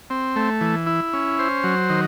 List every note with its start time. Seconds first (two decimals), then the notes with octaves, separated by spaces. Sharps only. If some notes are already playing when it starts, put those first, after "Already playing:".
0.10 C4
0.36 A3
0.61 E3
0.87 E4
1.13 C#4
1.39 C5
1.64 F#3
1.90 D#3